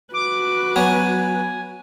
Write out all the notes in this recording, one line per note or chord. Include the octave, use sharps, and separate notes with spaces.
F#4 B4 D6
F#3 B3 G#5